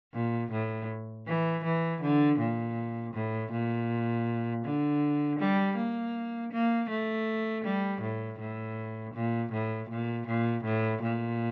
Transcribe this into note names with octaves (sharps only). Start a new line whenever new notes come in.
A#2
A2
E3
E3
D3
A#2
A2
A#2
D3
G3
A#3
A#3
A3
G3
A2
A2
A#2
A2
A#2
A#2
A2
A#2